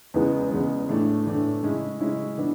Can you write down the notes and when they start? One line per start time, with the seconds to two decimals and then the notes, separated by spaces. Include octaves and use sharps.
0.14 E2 C#3 E3 G#3 B3
0.51 E2 C#3 E3 G#3 B3
0.89 A2 E3 A3 D4
1.26 A2 E3 A3 D4
1.62 C#3 G#3 C#4 E4
2.00 C#3 G#3 C#4 E4
2.38 E3 B3 D4